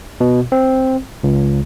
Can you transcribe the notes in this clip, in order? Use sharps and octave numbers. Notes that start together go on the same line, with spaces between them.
B2
C4
C#2